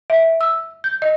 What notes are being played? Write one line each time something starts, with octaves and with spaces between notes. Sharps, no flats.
E5
E6
G6
D#5